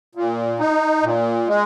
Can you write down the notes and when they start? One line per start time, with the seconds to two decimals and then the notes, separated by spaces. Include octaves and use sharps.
0.15 A#2
0.59 D#4
1.03 A#2
1.48 G#3